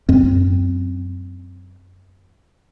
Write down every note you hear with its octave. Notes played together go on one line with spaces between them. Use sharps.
F#2 C4